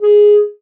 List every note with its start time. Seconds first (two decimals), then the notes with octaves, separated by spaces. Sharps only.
0.01 G#4